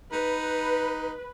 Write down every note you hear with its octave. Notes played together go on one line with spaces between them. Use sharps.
D#4 B4